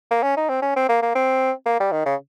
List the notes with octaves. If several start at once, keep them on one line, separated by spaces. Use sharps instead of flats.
A#3
C#4
D#4
C4
C#4
C4
A#3
A#3
C4
A#3
G3
D#3
C#3